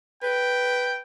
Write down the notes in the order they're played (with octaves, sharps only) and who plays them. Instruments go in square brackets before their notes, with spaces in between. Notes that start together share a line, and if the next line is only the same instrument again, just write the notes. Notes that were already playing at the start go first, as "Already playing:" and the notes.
[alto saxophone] B4 [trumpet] G5